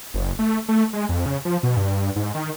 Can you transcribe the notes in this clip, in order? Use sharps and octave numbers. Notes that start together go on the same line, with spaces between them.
F#1
A3
A3
G#3
F2
C#3
F3
B2
G2
G#2
D#3